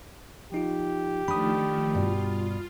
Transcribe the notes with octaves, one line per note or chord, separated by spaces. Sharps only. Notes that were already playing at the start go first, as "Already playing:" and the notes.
F3 D#4 F4 G4
D#3 F3 A3 D4 B5 D#6
G2 B2 F4